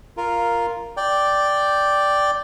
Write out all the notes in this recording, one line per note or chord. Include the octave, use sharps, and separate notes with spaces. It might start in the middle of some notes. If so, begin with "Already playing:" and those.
F4 A#4
D5 G5